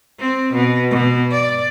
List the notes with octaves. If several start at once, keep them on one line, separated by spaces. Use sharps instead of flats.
C4
B2
B2
D5